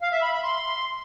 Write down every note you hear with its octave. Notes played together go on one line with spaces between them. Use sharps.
F5
E5
B5
B5
C6